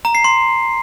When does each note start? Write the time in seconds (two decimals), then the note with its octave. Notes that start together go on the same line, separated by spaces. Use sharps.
0.05 A#5
0.15 C7
0.24 C6